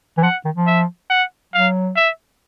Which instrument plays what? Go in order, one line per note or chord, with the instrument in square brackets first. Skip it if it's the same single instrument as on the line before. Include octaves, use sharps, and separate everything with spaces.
[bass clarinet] E3
[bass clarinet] F3 [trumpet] F#5
[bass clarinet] D#3
F3
[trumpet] E5
F#5
[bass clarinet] F#3 [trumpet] F5
[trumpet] E5